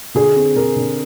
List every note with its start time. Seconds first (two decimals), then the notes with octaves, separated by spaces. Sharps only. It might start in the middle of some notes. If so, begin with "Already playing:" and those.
0.15 D3 G#4
0.36 C4
0.56 D3 A#4
0.76 D3